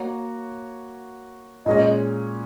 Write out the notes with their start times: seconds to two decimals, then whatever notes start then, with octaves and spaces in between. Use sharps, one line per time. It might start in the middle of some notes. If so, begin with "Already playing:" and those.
Already playing: A#3 F#4 C#5
1.66 A#2 G#3 C#4 D#5